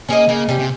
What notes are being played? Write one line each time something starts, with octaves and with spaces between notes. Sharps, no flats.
A#3 C#4 G#4 D#5
C#3 A#3
C3 G3 C#4
C3